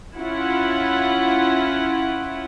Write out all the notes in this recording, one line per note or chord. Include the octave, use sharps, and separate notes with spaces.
C#4 E4 F4 F#5